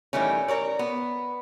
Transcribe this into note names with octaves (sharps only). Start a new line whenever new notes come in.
D#3 E3 G3 A3 C#4
A#4 C#5 D5
B3